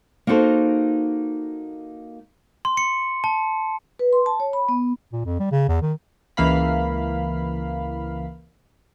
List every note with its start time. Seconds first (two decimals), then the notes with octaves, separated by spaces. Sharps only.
0.27 A#3 D#4 F#4 A4 C5
2.65 C6
2.77 C#7
3.24 A5
3.99 B4
4.13 C6
4.26 A5
4.40 C#5
4.53 B5
4.69 B3
5.13 A#2
5.25 F2
5.39 G3
5.52 C#3
5.68 E2
5.82 D#3
6.37 C#2 E3 A#3 F5 B5